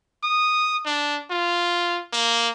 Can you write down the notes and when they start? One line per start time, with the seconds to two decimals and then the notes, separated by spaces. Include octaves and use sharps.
0.23 D#6
0.86 D4
1.31 F4
2.13 A#3